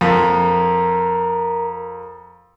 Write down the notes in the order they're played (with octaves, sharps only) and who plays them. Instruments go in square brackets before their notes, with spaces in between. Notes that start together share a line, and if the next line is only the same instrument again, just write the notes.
[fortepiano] F2 [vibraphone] A#4 A#5